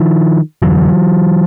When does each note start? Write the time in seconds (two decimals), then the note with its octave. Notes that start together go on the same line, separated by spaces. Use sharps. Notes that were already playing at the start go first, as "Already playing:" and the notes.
Already playing: D#3 F3
0.62 F2 D3 E3 F#3